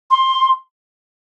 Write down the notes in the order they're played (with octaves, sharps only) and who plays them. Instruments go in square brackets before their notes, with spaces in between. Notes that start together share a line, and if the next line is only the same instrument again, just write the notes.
[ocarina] C6